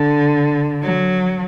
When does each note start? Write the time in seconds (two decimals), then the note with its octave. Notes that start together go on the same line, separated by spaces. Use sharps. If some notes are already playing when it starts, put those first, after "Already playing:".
Already playing: D3
0.82 F#3